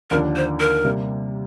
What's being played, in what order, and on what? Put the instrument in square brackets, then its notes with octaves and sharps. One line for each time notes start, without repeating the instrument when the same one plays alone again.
[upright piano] D#2 D3 F3 A#3 D4 [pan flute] A#4
[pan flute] C5
A#4
[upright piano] C3 G3 A#3